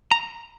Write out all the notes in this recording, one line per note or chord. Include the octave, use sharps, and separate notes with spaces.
A#5